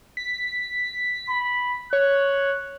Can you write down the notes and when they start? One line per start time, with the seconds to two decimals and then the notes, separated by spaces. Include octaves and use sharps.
0.17 B6
1.29 B5
1.93 C#5 F#6